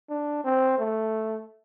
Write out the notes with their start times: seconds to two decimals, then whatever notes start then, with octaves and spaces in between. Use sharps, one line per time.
0.09 D4
0.44 C4
0.78 A3